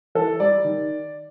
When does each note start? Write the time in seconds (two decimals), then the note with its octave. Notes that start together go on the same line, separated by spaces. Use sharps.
0.15 E3 A4
0.40 G3 D5
0.65 D#3